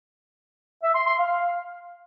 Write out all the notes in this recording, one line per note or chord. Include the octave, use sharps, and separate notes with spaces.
E5
C6
C6
F5